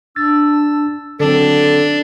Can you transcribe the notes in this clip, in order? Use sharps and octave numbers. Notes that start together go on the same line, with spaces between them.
D4 E6 A6
D3 F#3 C4 D4 A4